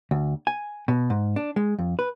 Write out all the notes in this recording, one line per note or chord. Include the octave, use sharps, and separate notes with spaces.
D2
G#5
B2
G#2
D4
G#3
F2
B4